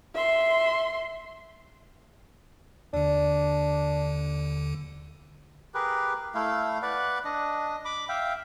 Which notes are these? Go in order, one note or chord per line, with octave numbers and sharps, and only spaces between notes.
E5 C6
D#2 D3 D4
G4 G#4 A#4 B4
A3 E4 F5
B4 D5 F#5
D4 D#5
B5 D6
E5 F5 G5